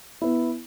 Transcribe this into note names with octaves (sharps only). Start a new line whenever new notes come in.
B3 E4